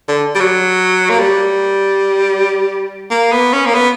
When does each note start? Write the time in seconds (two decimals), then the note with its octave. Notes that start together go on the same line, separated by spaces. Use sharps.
0.08 D3
0.35 G3
0.40 F#3
1.10 A#3
1.19 G3
3.11 A#3
3.32 B3
3.53 C#4
3.66 A#3
3.75 B3